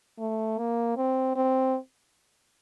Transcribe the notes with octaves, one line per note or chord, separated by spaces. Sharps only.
A3
A#3
C4
C4